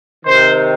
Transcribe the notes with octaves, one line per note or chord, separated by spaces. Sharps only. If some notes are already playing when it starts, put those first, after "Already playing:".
C3 D#3 C5